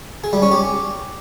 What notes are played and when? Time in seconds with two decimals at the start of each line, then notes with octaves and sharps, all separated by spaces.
0.24 G#4
0.33 G3
0.42 C#4
0.52 G4